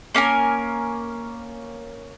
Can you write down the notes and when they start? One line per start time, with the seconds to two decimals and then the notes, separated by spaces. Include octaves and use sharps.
0.15 A#3 C#4 A#4 G#5